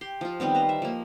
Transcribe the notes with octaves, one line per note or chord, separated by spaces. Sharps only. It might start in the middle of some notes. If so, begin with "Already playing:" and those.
G4 C6
F3 F4
D#3 G3 B3 C4
B4 C5 A#5
E5
F3 A#3